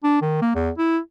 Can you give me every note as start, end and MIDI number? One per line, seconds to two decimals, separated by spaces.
0.04 0.22 62
0.22 0.41 51
0.42 0.51 58
0.55 0.70 40
0.78 0.98 64